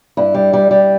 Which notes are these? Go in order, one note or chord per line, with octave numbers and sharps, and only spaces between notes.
G2 E4
G3
G3
G3